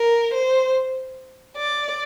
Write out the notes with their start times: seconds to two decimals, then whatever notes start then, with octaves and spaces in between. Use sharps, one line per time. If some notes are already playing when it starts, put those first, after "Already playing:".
Already playing: A#4
0.34 C5
1.57 D5